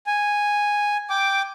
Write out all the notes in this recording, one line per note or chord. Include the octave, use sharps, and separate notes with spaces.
G#5
G5 D6